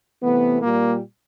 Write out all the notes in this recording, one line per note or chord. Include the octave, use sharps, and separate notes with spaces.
C3 E3 A3 B3
A#2 G3 A#3